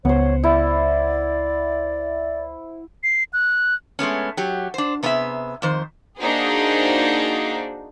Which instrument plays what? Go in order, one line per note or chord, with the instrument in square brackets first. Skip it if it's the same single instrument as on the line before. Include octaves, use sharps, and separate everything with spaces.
[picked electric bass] C#2 B3 [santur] C5 F#5 [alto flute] C#5
[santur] E4 [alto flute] D5
[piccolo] C7
F#6
[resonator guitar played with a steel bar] G#3 A3 B3 C#4
F#3 G4
D4 C5
C3 B3 D4 G#4 E5
F2 D#3 C5
[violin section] A#3 D4 D#4 F#4 G#4 C5